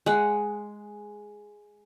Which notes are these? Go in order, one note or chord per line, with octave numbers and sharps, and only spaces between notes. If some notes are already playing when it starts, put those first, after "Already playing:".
G#3 F#5